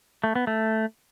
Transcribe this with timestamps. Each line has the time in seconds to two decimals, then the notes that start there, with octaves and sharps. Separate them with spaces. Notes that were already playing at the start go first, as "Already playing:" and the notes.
0.24 A3
0.35 B3
0.47 A3